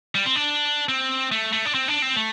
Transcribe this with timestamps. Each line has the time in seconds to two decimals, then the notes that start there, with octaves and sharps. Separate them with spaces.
0.15 G3
0.26 C4
0.36 D4
0.89 C4
1.32 A3
1.53 A3
1.65 D4
1.74 C4
1.88 D4
2.02 C4
2.16 A3